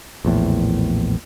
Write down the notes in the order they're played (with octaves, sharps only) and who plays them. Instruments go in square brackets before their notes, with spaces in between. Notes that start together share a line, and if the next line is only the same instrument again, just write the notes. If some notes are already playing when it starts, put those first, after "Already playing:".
[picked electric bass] A#1 E2 A2